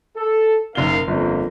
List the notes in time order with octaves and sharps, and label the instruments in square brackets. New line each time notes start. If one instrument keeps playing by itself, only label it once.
[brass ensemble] A4
[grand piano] F#1 G7 [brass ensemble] D#4 A#4 F5
[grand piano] G1 [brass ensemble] F2 A#3